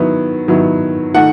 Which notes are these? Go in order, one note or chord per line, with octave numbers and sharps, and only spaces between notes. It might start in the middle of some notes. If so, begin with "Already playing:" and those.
Already playing: D#3 F#3 B3 E4
D#3 F#3 B3 E4
D#3 A3 D#4 F#5